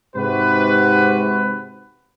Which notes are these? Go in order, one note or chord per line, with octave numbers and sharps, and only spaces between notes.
G#2 C3 F#4 B4